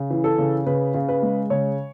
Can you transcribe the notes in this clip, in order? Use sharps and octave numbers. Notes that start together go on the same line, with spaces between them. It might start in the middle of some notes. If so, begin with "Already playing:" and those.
Already playing: C#3
E3
A4
C#3
C#3 B4
C#3
B4
G#3
C#3 C#5